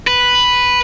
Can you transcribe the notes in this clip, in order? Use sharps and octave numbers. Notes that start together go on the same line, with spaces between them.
B4